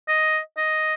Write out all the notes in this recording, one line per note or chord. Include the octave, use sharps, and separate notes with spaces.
D#5
D#5